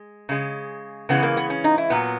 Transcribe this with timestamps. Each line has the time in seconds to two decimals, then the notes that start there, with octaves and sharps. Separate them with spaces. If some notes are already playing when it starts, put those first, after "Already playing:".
Already playing: G#3
0.29 C#3 G#3
1.09 C#3 E3 G#3 B3
1.23 A#3
1.37 B3
1.50 C#4
1.64 D#4
1.78 E4
1.90 A#2 F#3 B3